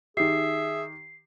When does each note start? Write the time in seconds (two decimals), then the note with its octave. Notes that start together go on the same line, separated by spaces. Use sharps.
0.17 D#3 G4 G#4 E5 C7